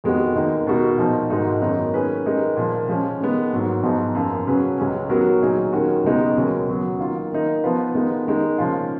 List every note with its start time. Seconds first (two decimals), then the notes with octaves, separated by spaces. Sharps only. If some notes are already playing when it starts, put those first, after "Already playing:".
0.04 F2 D#3 G#3 B3 F#4
0.35 D#2 D#3 A#3 D#4
0.67 B2 G#3 D#4 F#4 A#4
0.98 A#2 F3 B3 D#4
1.30 G#2 D#3 G#3 D#4 F#4
1.62 F#2 D#3 F#3 B3 D#4
1.93 D#3 A#3 C#4 G#4 B4
2.26 D#3 G#3 D#4 A#4
2.57 A#2 F3 A#3
2.88 F3 G#3 C#4
3.21 D#3 G#3 B3
3.51 G#2 F#3 A#3
3.83 G#2 F3 B3 D#4 G#4
4.15 F#2 F3 A#3
4.47 C#3 F#3 C#4 G#4 B4
4.78 C#2 C#3 G#3 C#4
5.09 D#3 F#3 B3 F#4 A#4
5.42 A#2 F#3 A#3 D#4 G#4
5.72 D#2 D#3 A#3 C#4 F#4
6.04 C#2 B2 G#3 B3 D#4
6.36 D#2 C#3 F#3 A#3 C#4
6.68 C#3 F#3 B3
6.99 D#3 A#3 F4
7.32 D#3 A#3 D#4
7.63 F3 B3 F4 B4
7.94 D#3 G#3 B3 D#4
8.27 D#3 G#3 D#4
8.58 C#3 F3 A#3 C#4 F4